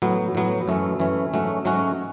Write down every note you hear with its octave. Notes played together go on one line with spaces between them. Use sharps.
A2 F#3 B3
A2 F#3 B3
F#2 E3 A3 C#4
F#2 E3 A3 C#4
G#2 F#3 A3 C#4 F#4
G#2 F#3 A3 C#4 F#4